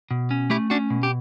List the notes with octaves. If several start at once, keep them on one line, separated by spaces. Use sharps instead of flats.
B2
C#4
A3 E4 G4
C#4 D4 F#4
B2
G4